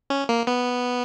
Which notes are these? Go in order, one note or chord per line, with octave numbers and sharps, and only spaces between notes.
C#4
A#3
B3